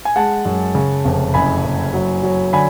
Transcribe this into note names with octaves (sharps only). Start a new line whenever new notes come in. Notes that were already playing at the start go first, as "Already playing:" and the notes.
G#5
G#3 F#5 A5
F#2
C#3
F1
F#1 G#5 B5
F#1
F#3
F#3
D3 G#5 B5